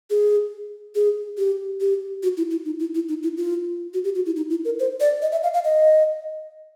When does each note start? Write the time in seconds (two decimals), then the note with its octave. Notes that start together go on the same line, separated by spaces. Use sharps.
0.10 G#4
0.95 G#4
1.38 G4
1.81 G4
2.23 F#4
2.37 E4
2.51 E4
2.65 D#4
2.79 E4
2.95 E4
3.09 D#4
3.23 E4
3.37 F4
3.94 F#4
4.04 G4
4.15 F#4
4.26 E4
4.36 D#4
4.50 E4
4.65 A#4
4.80 C5
5.00 D5
5.22 D#5
5.32 E5
5.43 F5
5.54 F5
5.64 D#5